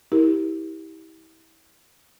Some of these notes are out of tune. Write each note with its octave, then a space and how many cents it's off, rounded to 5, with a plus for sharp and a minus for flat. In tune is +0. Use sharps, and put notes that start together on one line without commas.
E4 -30 G4 +0 A#4 +0